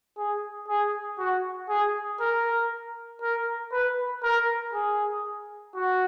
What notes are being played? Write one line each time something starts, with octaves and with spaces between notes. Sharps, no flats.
G#4
G#4
F#4
G#4
A#4
A#4
B4
A#4
G#4
F#4